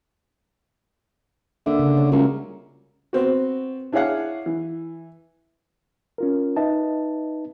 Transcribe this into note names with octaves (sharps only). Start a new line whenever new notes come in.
D3 A#3 E5
C#3
C#5
C#2 G3 F#4 A#4
B3 C4 F#4
D4 E4 G#4 C#5 F5 F#5
E3
C#4 F4 A#4
D#4 B4 D#5 E5 A5